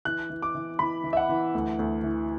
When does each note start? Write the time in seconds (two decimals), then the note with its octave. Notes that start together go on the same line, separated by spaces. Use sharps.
0.05 E3 F#6
0.30 E3
0.42 D6
0.55 E3
0.79 E3 B5
1.04 E3
1.13 E5
1.17 F#5
1.29 E3
1.54 D2
1.79 D2
2.04 E3